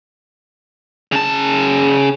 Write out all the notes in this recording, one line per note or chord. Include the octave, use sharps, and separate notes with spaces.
C#3 A5